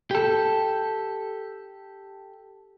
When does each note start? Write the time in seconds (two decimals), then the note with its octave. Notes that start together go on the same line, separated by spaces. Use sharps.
0.11 G4 A4